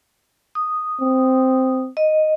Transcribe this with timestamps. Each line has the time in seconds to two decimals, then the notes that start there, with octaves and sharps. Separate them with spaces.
0.55 D#6
1.01 C4
1.97 D#5